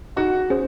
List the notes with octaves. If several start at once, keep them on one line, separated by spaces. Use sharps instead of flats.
D#4 F#4 G#4 D#5 F#5
C#4 G#4 C5